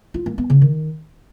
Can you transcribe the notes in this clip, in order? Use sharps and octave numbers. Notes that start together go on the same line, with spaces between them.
F4
A#3
B3
C#3
D#3